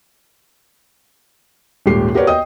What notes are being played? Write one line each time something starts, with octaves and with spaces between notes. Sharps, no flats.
D#1 G#2 G4 C7
F#4 G4 A#4 B4 C#5 D5
D#5 G5 D#6